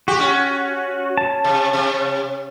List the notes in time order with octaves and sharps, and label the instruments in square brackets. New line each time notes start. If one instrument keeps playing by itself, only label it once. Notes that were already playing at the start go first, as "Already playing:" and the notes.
[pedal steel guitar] F#4 [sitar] G4
[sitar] C#4
[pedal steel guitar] A5
[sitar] C3
C3